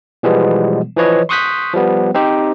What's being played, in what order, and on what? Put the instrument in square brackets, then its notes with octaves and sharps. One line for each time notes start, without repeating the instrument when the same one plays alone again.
[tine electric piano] B2 E3 F3 G3 G#3 B3
E3 F3 B4 C#5 D#5
C6 C#6 D#6 F#6 G6 B6
F3 G3 B3
C4 D#4 G4 C5